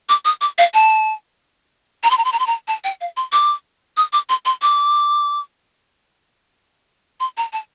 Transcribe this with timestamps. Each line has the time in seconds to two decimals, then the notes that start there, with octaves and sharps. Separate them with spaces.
0.09 D6
0.25 D#6
0.41 D6
0.58 F5
0.74 A5
2.03 A#5
2.11 C6
2.18 A#5
2.25 C6
2.32 A#5
2.39 C6
2.47 A#5
2.68 A5
2.84 G5
3.01 F5
3.17 C6
3.33 D6
3.97 D#6
4.13 D6
4.29 C6
4.46 C6
4.62 D6
7.20 C6
7.37 A#5
7.53 A5